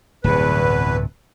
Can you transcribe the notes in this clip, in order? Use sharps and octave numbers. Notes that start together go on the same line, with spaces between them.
D1 E2 G2 C3 B4